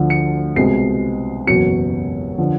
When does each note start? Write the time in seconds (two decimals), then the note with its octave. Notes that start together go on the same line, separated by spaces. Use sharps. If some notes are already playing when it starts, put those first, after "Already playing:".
Already playing: D2 D3 F3
0.10 C#7
0.56 C2 B2 G#3 C4 C7
1.47 F#1 E2 B2 F#3 C#7
2.38 D3 F3